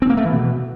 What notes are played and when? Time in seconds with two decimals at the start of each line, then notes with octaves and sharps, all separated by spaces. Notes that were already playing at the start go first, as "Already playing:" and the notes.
0.02 C4
0.10 A#3
0.17 A3
0.25 E3
0.32 B2